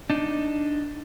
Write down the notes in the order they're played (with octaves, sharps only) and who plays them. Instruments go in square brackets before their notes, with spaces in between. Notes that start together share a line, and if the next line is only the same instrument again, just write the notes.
[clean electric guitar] D4 D#4